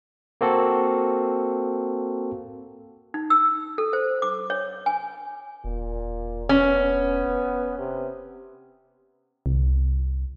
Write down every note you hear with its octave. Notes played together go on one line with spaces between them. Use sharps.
A#3 C4 F#4 A4
D#4
E6
A4
C5
D6
C#5
G#5
E1 A#2
B3 C#4
C3
C2